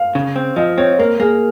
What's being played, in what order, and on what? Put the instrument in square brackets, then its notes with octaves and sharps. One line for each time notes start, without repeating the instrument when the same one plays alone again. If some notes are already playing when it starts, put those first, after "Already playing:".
Already playing: [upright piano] F5
[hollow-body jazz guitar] C#3
C4
[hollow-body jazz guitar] F3 [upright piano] D#5
[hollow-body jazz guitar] C4 [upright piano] C#5
[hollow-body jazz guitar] A#3 [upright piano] A#4
[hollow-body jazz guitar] A#3 [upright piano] G#4